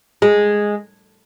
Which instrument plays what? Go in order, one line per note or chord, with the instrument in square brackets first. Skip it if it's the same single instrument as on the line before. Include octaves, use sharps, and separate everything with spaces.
[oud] G#3